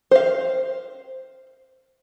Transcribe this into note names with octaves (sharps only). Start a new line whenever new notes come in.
C5 F5